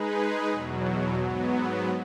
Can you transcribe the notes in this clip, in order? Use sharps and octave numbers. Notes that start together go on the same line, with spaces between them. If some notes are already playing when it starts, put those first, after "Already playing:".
Already playing: G#3 D#4 G#4 B4
E2 B2 F#3
G#2 F#3 B3